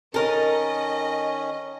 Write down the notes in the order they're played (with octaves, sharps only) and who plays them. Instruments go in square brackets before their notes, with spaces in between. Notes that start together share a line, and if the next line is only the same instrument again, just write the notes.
[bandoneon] D#3 C#4 [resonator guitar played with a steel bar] A4 A#4 [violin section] D#5